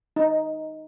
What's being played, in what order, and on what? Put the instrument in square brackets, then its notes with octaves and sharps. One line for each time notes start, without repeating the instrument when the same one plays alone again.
[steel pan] D#4